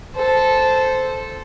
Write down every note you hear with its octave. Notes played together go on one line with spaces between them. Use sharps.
A4 C5